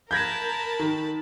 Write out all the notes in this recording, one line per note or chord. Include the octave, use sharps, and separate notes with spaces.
A#4 A5 B5 G6 G#6 A#6
D#3